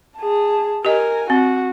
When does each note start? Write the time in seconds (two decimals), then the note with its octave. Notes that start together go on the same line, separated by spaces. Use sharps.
0.17 G#4 A5
0.85 G4 A#4 D#5 G#5
1.30 C4 F#4